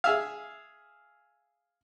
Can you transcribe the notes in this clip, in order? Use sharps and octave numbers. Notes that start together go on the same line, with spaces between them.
G#4 E5 F5